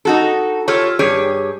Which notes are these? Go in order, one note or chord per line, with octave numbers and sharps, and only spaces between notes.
D#4 F#4 A4
F4 G4 A4 C#5
G2 G4 G#4 C#5